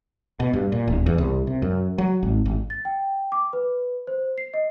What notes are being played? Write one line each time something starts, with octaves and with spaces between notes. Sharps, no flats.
B2
G2
A#2
D1
E2
C2
C3
F#2
F#3
G#1
G#1
A6
G5
D6
B4
C5
C7
D#5